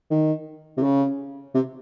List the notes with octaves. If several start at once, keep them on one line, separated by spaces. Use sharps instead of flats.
D#3
C3
C#3
C3